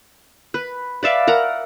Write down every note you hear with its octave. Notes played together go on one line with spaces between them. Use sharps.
B4
B4 D5 E5 F5
A#4 F#5 A#5